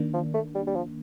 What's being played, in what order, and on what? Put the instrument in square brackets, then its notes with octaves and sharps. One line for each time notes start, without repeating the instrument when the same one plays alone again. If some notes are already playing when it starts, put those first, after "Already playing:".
Already playing: [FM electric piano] D#3 A#3 D4
[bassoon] F3
A3
G3
G3
F3